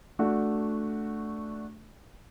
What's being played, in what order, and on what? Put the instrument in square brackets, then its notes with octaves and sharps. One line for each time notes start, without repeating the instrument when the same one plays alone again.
[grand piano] A3 D4 F#4